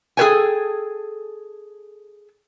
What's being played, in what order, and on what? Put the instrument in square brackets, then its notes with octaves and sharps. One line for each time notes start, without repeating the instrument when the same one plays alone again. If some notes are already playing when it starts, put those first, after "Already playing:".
[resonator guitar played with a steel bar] G#4 A4 B4 C#5 G5 G#5